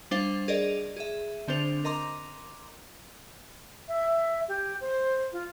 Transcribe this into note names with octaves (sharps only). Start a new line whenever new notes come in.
G3 D4 C5 F5
G#4 A#4 D5 D#5
G#4 E5
D3 C4 D4 C5 F7
A#4 D#5 A#5 C6 D6
E5
G4
C5
F4